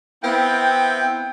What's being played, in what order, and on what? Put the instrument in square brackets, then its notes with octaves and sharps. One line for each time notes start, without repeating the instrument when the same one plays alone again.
[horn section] B3 E5 G5 [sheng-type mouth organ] C4 E4 F5